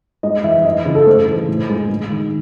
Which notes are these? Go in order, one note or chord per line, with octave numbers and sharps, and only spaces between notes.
G#3 D#5
E3 E5
E3 D#5
C#3
A4
A3 C5
E3
A2
G#3
G#3
D#3